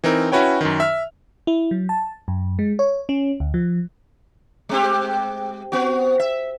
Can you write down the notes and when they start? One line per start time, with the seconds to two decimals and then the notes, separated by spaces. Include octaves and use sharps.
0.04 E3 C4 D#4 A#4
0.32 C#4 E4 F#4 B4 C#5 G5
0.61 F#2 D#3
0.80 E5 F6
1.47 E4
1.71 F#3
1.89 A5
2.28 F#2
2.59 G#3
2.79 C#5
3.09 C#4
3.40 D2
3.54 F3
4.69 G#3 C4 G4
5.72 B3 F#4
6.20 E5